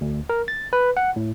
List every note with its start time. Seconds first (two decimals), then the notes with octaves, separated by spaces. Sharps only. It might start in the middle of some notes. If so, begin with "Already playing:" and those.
0.01 D2
0.30 A#4
0.48 A6
0.73 B4
0.97 F#5
1.16 A2